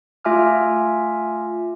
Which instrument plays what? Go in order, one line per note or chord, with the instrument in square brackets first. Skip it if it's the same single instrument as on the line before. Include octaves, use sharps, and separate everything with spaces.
[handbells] A3 F4 E5 G#5 D6 F6